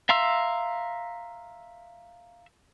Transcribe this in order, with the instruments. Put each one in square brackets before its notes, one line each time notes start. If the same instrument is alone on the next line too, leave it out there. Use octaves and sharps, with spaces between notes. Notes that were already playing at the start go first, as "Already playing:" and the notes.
[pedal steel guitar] E5 F5 A#5 C6 E6